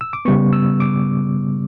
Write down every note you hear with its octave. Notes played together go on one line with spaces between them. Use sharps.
E6
D6
C#3 G3 B3 C#6
E6
D6